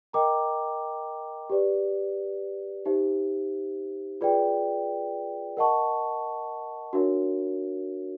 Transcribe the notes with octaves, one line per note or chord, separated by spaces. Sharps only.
A#4 D#5 G5 A#5 D6
G4 B4 D5
D#4 G4 C5 E5
F4 G#4 B4 D5 G5
A#4 D#5 F#5 A5 C#6
D4 F#4 A#4 C#5 E5